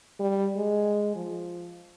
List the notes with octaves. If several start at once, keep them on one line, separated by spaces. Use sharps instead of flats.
G3
G#3
F3